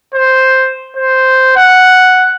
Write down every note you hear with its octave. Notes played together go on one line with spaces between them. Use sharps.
C5
C5
F#5